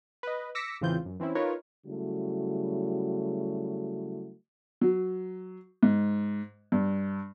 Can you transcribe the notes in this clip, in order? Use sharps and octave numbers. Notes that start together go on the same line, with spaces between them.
B4 D#5
D6 E6 A#6 B6 C#7
A1 C#3 E3 C4 F4 G6
F#2
E3 C4 C#4 E4
D#4 F4 A#4 B4 C#5
C#3 F#3 G3 A3 E4 F#4
F#3
G#2
G2